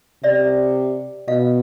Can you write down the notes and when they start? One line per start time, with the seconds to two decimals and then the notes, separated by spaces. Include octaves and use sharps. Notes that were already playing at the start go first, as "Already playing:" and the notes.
0.23 C3 D5 E5
1.28 B2 D#5 F5